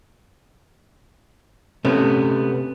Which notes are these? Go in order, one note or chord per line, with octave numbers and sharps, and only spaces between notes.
C3 A3 B3 C#4